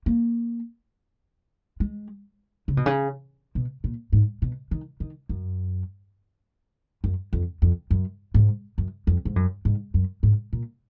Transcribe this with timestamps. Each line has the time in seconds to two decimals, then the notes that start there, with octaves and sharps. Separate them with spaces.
0.06 A#3
1.80 G#3
2.68 C#3
2.77 B2
2.86 C#3
3.55 B2
3.84 A#2
4.13 G#2
4.42 B2
4.71 D#3
5.00 D#3
5.29 F#2
7.04 F#2
7.33 F2
7.62 F2
7.91 F#2
8.34 G#2
8.78 F#2
9.07 F2
9.25 G#2
9.36 F#2
9.65 G#2
9.94 F#2
10.23 G#2
10.53 A#2